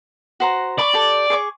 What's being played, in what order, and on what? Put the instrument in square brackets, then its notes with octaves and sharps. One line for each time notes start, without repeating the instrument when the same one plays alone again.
[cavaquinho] F#4 C5 A#5
[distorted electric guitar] D5 [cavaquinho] B5 C#6
[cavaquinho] G4 A4
G#4 C#6 D6